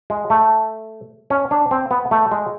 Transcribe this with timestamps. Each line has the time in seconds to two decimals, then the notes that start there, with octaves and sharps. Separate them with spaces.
0.10 G#3
0.30 A3
1.30 C#4
1.51 D4
1.71 C4
1.91 B3
2.11 A3
2.32 G#3